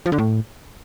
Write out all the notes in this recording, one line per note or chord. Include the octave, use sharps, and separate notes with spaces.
F3
D3
A2